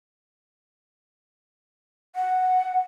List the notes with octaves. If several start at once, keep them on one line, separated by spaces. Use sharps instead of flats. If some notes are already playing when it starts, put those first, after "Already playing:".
F#5